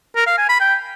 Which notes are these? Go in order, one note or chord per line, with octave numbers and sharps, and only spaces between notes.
A#4
F5
G#5
B5
G5